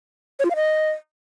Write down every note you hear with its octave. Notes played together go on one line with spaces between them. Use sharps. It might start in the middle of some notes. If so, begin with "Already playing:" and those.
C#5
F4
F5
D#5